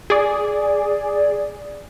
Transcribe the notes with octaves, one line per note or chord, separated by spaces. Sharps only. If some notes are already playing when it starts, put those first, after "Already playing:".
G#4 D5